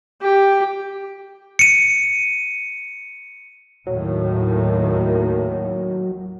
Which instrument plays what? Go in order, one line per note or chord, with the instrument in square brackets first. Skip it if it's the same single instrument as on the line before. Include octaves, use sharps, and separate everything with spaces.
[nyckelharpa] G4
[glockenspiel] C#7 D#7
[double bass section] D#2 A2 D#3 [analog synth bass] F#3